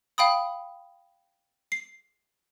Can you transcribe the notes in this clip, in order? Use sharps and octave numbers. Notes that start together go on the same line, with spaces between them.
F5 G5 B5 D#6
C7